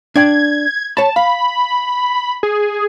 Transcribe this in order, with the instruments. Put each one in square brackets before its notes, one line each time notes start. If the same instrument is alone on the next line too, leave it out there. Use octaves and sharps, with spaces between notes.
[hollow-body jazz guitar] D4 D5 G5 [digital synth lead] G#6
[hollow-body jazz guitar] C#5 B5 [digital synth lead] A5
[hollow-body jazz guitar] F5 [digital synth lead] B5
[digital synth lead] G#4